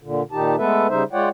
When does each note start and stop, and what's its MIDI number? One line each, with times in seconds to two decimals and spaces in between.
0.02 0.22 46
0.02 0.22 50
0.32 0.56 46
0.32 0.56 51
0.32 0.56 63
0.32 0.56 67
0.32 0.56 81
0.57 0.87 56
0.57 0.87 57
0.57 0.87 59
0.57 0.87 69
0.57 0.87 71
0.57 0.87 76
0.89 1.04 49
0.89 1.04 55
0.89 1.04 63
0.89 1.04 72
0.89 1.04 76
1.13 1.29 56
1.13 1.29 65
1.13 1.29 73
1.13 1.29 74
1.13 1.29 78
1.13 1.29 79